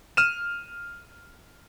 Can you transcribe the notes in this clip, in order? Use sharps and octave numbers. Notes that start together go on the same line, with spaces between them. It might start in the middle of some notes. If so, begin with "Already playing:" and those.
F6 D#7 E7